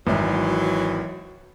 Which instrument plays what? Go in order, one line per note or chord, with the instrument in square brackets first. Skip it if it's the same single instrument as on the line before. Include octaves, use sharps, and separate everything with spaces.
[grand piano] G#1 G#2 [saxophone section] E3 F#3